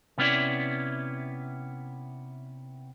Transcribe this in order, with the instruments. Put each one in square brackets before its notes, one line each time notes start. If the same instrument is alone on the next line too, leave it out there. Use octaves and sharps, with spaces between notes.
[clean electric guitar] C3 B3 C#4 E4 D5